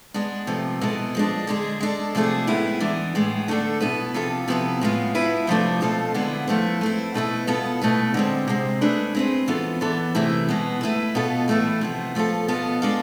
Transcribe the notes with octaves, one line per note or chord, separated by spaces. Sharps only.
G#3 B3 D4
C3 F3 A3
B2 G#3 B3 E4 A4
F3 G#3 D4
D3 G#3 D4 G#4
G#3 D4 A4
C3 F3 A3 D4 G#4
A2 G#3 B3 E4
E3 G#3 B3 D4
A2 G#3 B3
D3 A3 D4 A4
B2 B3 E4 B4
C3 F3 B3 F4 A4
C3 F3 B3 E4 B4
A2 G#3 B3 F4
F3 B3 E4 B4
C3 F3 A3 D4
B2 A3 C4 F4 A4
D3 G#3 B3 E4
F3 A3 E4 B4
A3 C4 E4
B2 A3 E4 B4
B2 B3 F4 A4
B2 A3 E4 B4
D3 G#3 C4
C3 G#3 C4
A3 D4 G#4 B4
G#3 C4 G#4 B4
E3 B3 F4 A4
E3 B3 D4 A4
C3 E3 A3 E4 G#4
B2 G#3 B3
A3 E4 B4
B2 B3 F4 A4
A2 E3 A3 E4
C3 F3 B3
F3 A3 D4 F4 A4
B2 B3 F4 A4
G#3 D4 F4 A4